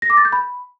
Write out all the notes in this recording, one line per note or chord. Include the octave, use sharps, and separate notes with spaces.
A#6
D6
A6
G6
B5